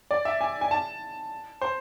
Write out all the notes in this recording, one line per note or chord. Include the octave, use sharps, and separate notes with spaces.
D5
E5
G#5
G#5
A5
C5